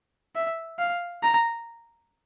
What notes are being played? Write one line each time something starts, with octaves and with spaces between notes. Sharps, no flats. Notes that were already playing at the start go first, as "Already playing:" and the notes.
E5
F5
A#5